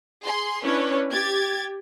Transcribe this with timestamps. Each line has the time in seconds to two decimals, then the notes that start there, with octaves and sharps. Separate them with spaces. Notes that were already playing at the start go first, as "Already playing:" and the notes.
0.25 G#4 C6
0.64 C#4 D4 E4 B4 C#5
1.10 G4 G5 G#6 A6